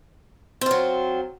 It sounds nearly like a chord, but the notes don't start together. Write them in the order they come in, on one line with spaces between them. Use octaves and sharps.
C4 F4 F#3